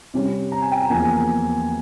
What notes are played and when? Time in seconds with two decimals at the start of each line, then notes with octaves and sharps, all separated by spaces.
0.14 C3 G3 C#4
0.52 A#5
0.62 G#5
0.72 G5
0.81 A#5
0.90 E2 C#3 F3 A#3 G#5